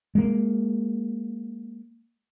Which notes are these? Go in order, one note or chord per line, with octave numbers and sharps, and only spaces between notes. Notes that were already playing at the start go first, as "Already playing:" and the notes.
G#3 A#3